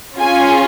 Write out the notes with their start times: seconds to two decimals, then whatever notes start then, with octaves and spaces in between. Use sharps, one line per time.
0.19 C#4 F4 G#4 G#5